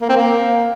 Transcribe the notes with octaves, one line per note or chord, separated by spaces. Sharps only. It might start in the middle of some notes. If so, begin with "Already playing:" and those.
A#3
C4
A#3